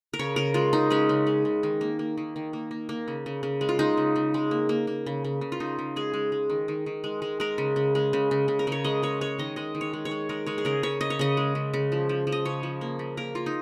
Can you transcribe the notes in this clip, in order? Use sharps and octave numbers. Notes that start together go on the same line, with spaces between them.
A#4
C#3 C#5
C#3 A#4
G#3 F4
C#3 D#4
G#3 C#4
C#3
G#3
C#3
D#3
A#3
A#3
D#3
D#3
A#3
A#3
A#3
C#3
C#3
C#3
G#3
F4
G#3 D#4
C#3
C#3
G#3
A#3
A#3
A#3
C#3
C#3
C#3
F4
C#3 D#4
C#3
G#3 G#4
G#3
G#3
D#3
D#3
D#3
G#3
G#3
G#3 A#4
C#3
C#3
G#3
C#3
C#3
C#3
A#4
C#3 C#5
G#3 D#5
G#3 C#5
G#3 C#5
D#3 D#5
G#3 D#5
D#3
C#5
G#3
C#5
G#3
G#3 A#4
G#3 C#5
G#4
C#3 A#4
C#3 C#5
C#3 D#5
C#5
C#3 D#5
G#3
C#3
C#3
F3
F3
F3
D#5
C#3 C#5
F3
A#3
C#3
A#3 A#4
A#3 F4
D#4